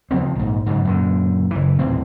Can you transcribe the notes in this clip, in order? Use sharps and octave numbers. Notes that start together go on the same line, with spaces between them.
C#3 F3 B3 C4
A#1 G#2
G#2 C#3 F#3
F#2 A#2 D3
F#1 E3
D#1 A2 E3 C4